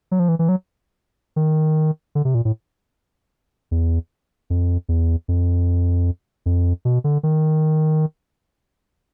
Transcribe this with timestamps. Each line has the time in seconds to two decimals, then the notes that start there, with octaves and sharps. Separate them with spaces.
0.11 F#3
0.19 F3
0.29 E3
0.39 E3
0.49 F#3
1.36 D#3
2.15 D3
2.25 C3
2.35 A#2
2.45 A2
3.71 E2
4.50 F2
4.89 E2
5.28 F2
6.46 F2
6.85 B2
7.04 D3
7.23 D#3